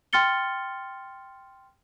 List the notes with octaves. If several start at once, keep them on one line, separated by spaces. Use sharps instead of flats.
G5 C6 F6 A6 C#7 G7